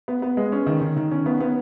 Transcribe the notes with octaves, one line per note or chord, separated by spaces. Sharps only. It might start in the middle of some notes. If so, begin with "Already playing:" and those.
B3
B3
G#3
C#4
D#3
D#3
D#3
C#4
B3
B3